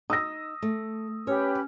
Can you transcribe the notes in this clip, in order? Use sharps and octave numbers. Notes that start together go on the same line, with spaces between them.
D#4 D#6 E6 A#6
A3
C#4 G4 B4 C#5